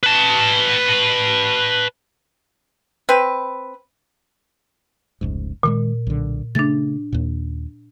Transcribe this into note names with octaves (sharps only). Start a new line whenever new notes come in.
B4 A5
C4 B4
F1 C#2 G#2
A#2 D#3 E3 G#3
B1 D3
C#3 A3 D4 A6
D#2 A#2